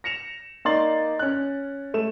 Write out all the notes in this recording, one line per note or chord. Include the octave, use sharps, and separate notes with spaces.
A#6 C#7 E7 F7
A#3 D#4 D5 C6 A6 F#7
C#4 F#6
A3 E7